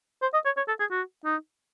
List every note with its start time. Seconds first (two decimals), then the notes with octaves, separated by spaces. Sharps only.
0.22 C5
0.34 D#5
0.45 C#5
0.57 C#5
0.68 A4
0.80 G#4
0.91 F#4
1.25 D#4